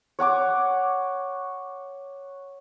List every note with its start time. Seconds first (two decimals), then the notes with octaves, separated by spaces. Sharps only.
0.19 C#5 F#5 C#6 D6